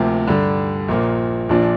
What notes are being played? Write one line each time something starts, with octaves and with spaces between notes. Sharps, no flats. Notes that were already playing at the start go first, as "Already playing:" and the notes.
Already playing: D2 C3 F3 A#3
G2 D3 G3
A#1 A#2 A#3
A#1 A#2 F3 D4